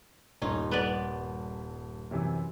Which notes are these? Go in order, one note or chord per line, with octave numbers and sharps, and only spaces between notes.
D#1 G2 C#4 D#4 C6
B3 B4 D5
F#2 C3 E3